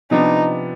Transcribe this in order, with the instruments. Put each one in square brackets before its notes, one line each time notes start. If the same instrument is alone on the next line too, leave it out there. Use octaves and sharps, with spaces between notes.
[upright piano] C3 F3 B3 D4 [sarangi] D#4